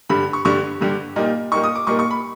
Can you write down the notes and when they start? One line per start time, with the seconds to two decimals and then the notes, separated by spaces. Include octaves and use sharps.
0.09 G2 D3 G3 B5
0.33 C#6
0.45 G2 D3 G3 C#6
0.81 G2 D3 G3
1.16 A#2 G3 A#3 D#4
1.52 A#2 G3 A#3 D#4 C#6
1.63 D#6
1.75 D6
1.87 A#2 G3 A#3 D#4 C#6
1.99 C#6
2.11 B5